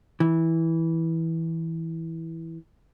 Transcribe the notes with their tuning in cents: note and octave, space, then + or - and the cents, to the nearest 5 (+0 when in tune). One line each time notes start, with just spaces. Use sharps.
E3 -10